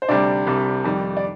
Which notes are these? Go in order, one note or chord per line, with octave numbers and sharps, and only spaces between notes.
C5
D2 C3 G3 D4 D5
C2 C3 G3
F2 D#3 G3
D5